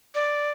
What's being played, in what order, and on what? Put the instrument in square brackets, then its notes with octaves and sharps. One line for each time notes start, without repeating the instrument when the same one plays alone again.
[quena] D5